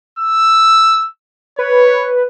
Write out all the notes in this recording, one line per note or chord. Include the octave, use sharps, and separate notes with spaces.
E6
B4 C#5